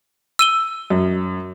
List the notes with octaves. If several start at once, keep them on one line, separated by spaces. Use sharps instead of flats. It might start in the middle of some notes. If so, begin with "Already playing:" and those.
E6 D#7 G7
F#2